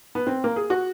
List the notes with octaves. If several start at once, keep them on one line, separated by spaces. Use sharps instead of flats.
B3
C4
A#3
G#4
F#4